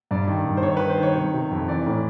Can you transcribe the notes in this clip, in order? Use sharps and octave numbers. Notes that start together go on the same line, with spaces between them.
G2 D5
D#3
G2
C5
D#3 C#5
D#3 B4
C5
D#3
C#5
C3
C3
F2
E3 D5
A2